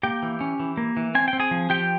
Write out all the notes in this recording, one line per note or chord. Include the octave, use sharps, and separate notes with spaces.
A#3 G4 G5
E3
C#4
E3
A#3
E3
C4 G#5
G5
C4
G#4 G#5
F3
F3 G4 G5